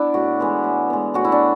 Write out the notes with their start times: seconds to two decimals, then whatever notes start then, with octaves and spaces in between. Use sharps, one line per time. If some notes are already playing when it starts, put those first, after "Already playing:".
Already playing: B3 D4 E4
0.14 A2 F#4
0.40 E3 G#3 B3
0.64 A2
0.90 G#3 B3
1.14 A2 F#4
1.25 E4
1.32 D4